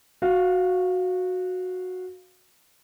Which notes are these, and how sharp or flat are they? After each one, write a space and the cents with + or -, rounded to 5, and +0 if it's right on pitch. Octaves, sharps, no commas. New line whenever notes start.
F#4 -10 F5 +0